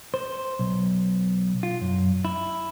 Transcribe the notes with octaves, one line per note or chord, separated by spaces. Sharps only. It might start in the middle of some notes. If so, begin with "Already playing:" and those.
C5
B1
F4
F#2
E4